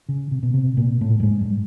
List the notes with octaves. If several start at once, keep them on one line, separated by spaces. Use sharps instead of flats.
C#3
C3
B2
C3
A#2
A2
G2
G#2
G2